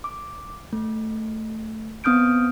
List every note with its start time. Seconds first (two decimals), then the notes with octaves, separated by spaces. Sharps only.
0.04 D6
0.73 A3
2.04 B3 C4 D#6 F6 G6 D7